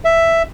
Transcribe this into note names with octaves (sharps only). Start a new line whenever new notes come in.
E5